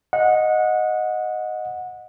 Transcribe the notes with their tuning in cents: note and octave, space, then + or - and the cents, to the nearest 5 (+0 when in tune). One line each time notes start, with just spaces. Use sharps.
D#5 +0 F#5 -20